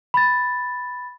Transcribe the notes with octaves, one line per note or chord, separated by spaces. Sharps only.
B5 A6